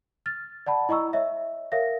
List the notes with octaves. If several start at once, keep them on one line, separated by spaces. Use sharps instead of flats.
F6 A6
D5 F#5 A5 B5
E4 D#5 A#5 C#6 E6
C#5 D#5 E5
A#4 C#5 E5 F5 A#6